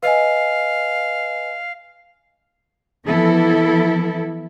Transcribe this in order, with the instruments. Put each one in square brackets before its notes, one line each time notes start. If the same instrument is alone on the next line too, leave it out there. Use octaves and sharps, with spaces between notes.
[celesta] B4 D#5 G#5 [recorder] F5
[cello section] E3 F3 B3 E4 A4